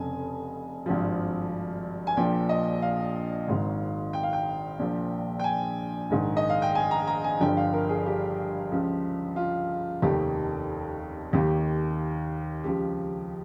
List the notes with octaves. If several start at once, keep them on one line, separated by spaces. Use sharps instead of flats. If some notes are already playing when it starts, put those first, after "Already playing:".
Already playing: F1 F2 C#3 G#5
G#1 G2 F3
G#5
A#1 A#2 F3 G5
D#5
F5
G#1 G#2 D#3
G5
F5
G5
A#1 A#2 F3
G5
G#5
A#1 G#2 D#3
D#5
F5
G5
G#5
A#5
A#5
G#5
G1 G2 F3 G5
F5
A#4
G#4
G4
C#2 C#3 F3
F4
F1 D#2 D#3 G4
D#2 D#3 G4
C#2 C#3 F3 G4